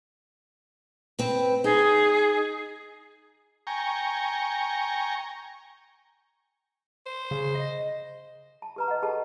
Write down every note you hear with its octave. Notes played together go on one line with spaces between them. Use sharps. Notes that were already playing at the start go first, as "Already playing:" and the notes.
C4 B4
D#4 G#4
G5 G#5 A#5 C#6
C5
C#3
D#5
A5
G4 B4 A#5
D#5 F#5
G4 A4 A5